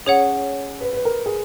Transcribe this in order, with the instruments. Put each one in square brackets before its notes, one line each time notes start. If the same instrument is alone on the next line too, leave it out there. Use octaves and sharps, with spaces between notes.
[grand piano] C#4 [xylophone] G#4 C#5 F#5
[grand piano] B4
B4
A#4
G#4